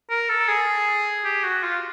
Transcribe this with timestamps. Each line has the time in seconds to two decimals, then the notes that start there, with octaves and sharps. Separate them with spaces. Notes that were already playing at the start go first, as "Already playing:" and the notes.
0.10 A#4
0.29 A4
0.48 G#4
1.25 G4
1.44 F#4
1.64 F4